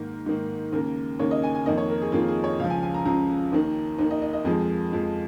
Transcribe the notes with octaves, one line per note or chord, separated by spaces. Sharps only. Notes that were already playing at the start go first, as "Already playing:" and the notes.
Already playing: G#2 D#3 A#3 A#4
G#2 D#3 A#3
D#2 C#3 A#3 A#4
D#2 C#3 A#3 C#5
D#5
G#5
G#5
F2 D#3 A#3 D#5
C#5
A#4
G#4
F2 D#3 A#3 F4
G#4
C#5
C#2 C#3 F3 F5
G#5
G#5
A#5
C#2 C#3 F3 A#5
D#2 D#3 A#3
D#2 D#3 A#3
D#5
D#5
D#5
F2 F3 G#3 G#4
F2 F3 G#3